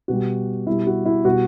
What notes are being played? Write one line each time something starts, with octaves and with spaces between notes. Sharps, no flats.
B2 G3 F#4
B2 G3 E4
F#4
E4
B2 G3 F#4